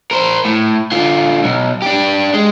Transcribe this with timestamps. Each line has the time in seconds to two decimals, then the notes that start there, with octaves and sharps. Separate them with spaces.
0.11 A#4 C5
0.45 A2
0.92 D3 F4
1.44 B1
1.82 D4 G4
2.34 G#3